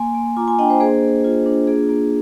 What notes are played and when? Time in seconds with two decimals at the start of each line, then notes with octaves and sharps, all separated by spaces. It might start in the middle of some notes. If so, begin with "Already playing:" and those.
Already playing: A#3 G#5 C6
0.15 A#3
0.37 F4 A#5 D6
0.47 G#5 C6
0.59 D4 D#5 G5
0.70 C5 D#5
0.80 A#3 G#4 C5
1.03 A#3
1.24 F4
1.46 D4
1.67 A#3 G#4
1.89 A#3